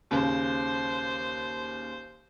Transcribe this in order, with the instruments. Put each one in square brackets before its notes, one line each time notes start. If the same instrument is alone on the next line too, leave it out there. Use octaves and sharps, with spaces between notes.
[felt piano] D#2 C#3 [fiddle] C5